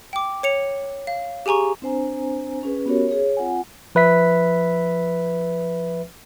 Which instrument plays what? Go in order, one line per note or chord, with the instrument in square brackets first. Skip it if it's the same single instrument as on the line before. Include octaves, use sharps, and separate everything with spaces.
[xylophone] G5 D6
C#5 C#7 F7
F5
G4 G#4 G#5 A#5 C#6
[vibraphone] C4 D4 C5 G#5 A#5
C#4 G#4 B4
B3 C#4 F#4 G4 A#4 C#5
G#4 C#5
C4 F4 F#5 G#5
[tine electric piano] F3 B4 E5 B6